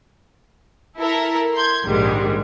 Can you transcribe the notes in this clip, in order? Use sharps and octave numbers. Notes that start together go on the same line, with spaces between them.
E4 A4 A#4
C6 G6 G#6
A#1 G#2 D#3 G3 G#3